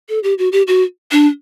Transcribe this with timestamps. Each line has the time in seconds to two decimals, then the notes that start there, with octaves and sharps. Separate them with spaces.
0.09 A4
0.24 G4
0.38 F#4
0.52 G4
0.68 F#4
1.12 D4